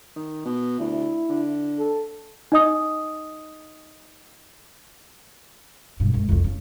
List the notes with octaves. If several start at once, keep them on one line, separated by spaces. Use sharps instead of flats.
D#3
B2
D2 E4
D3
A4
D#4 D#5 D#6
G2 B2
F#2 G#3
C2 F2
C#3